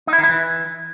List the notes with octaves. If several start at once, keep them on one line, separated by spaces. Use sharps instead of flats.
D#4
E4
D#3
E4
E3